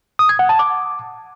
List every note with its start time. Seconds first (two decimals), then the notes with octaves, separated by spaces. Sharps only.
0.19 D#6
0.29 G#6
0.39 F#5
0.49 A5
0.59 D6